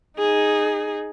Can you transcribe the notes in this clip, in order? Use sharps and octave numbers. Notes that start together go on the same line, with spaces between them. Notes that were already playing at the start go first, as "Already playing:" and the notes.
D#4 G#4